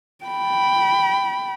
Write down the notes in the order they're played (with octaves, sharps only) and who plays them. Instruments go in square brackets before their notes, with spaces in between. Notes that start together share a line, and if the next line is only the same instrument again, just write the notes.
[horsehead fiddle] G5 B5